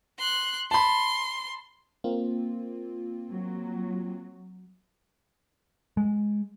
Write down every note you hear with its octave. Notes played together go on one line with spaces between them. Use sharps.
C6 F#6
A5 B5 C6
A#3 C4 F4
F#3
G#3